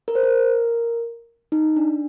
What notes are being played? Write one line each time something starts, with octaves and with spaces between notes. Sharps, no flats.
A#4
C5
A#4
D#4
D4